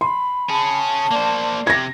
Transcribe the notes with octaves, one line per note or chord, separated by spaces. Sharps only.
B5 C6
C#4 G#4 A5
A#3 C5 D5
C3 G#6 A#6